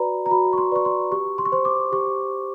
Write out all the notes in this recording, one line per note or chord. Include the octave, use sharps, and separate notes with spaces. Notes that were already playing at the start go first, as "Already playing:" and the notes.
Already playing: F#4 B4 D5 A#5 B5
A#5
F#4 B5
C#6
C6
B4 D5 C#6
C6
G4 C#6
C6
C#6
C5 C6
D6
G4 C#6